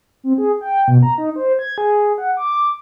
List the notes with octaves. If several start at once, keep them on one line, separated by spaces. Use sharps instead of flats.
C4
G#4
G5
B2
A#5
D#4
C5
G#6
G#4
F#5
D6